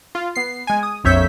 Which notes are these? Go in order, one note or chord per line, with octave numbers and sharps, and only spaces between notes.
F4
B3 C7
G#3 G#5
D#6
A#1 F2 C#5 E5 G6 B6